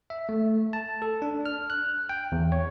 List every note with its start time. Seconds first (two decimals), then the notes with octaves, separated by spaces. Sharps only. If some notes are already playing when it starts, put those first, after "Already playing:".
0.10 E5
0.29 A3
0.73 A5
1.02 A4
1.22 D4
1.46 F6
1.70 F#6
2.09 G5
2.32 E2
2.52 C#5